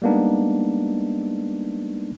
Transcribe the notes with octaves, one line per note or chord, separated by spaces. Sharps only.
G3 G#3 A#3 B3 D4 D#4